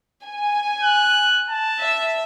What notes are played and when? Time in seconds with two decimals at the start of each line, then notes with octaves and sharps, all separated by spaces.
0.25 G#5
0.83 F#6
1.50 A5
1.80 E5